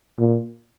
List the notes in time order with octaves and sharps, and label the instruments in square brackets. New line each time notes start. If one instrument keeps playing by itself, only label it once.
[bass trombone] A#2